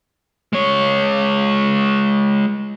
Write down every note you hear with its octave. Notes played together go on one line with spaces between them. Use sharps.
G#3 C#5